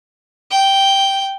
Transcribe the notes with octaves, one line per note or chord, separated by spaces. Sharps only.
G5